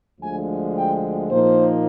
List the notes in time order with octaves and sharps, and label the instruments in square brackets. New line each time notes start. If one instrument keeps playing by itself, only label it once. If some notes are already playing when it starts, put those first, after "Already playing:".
[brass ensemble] D2 D3 F3 G#3 G#5
G5
A#2 F3 A#3 D#4 C5